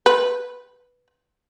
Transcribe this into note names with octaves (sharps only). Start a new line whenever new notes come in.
B4